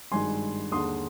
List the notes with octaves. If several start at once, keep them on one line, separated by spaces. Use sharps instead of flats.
G#1 G2 D#3 G#3 G#5 C6
D#2 D3 G#3 C6 D#6